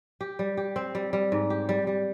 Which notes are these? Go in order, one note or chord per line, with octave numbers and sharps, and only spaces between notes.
G4
G3
G4
C4
G3
G3
G#2
G4
G3
G3